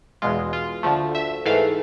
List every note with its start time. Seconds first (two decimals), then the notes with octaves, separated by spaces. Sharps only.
0.22 E2 B2 G#3 F4
0.53 F4
0.83 D2 D3 F3 A3
1.15 E5
1.45 G#2 E3 A3 F5